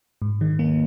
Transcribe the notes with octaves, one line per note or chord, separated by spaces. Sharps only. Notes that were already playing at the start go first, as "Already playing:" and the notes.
G#2
D#3
A#3